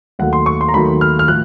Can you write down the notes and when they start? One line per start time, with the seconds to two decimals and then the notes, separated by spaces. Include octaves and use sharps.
0.19 D#2 D#3 F#3 A3 F#5
0.33 C6
0.46 C#6
0.61 C6
0.69 A#5
0.74 D#2 D#3 F#3 A3 B5
1.01 F6
1.19 F6
1.28 A2 F3 F#6